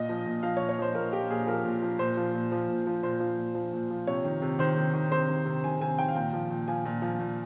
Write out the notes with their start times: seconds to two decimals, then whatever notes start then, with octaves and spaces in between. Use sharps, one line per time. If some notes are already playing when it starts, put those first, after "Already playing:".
Already playing: A#2 D#5
0.09 F3
0.26 A#2
0.43 F3 F5
0.57 C#5
0.61 A#2
0.69 C#5
0.79 F3 C5
0.95 A#2 A#4
1.13 F3 G4
1.30 A#2 G#4
1.47 F3 A#4
1.65 A#2
1.82 F3
1.99 A#2 C5
2.17 F3
2.34 A#2
2.52 F3
2.69 A#2
2.87 F3
3.03 A#2 C5
3.20 F3
3.38 A#2
3.55 F3
3.73 A#2
3.90 F3
4.07 C3 C#5
4.25 D#3
4.42 C3
4.59 D#3 C5
4.77 C3
4.94 D#3
5.11 C3 C5
5.28 D#3
5.46 C3
5.64 D#3 G#5
5.81 C3 G#5
5.98 D#3 G5
6.08 F5
6.15 A#2 G5
6.33 F3
6.50 A#2
6.68 F3 G#5
6.85 A#2
7.02 F3
7.20 A#2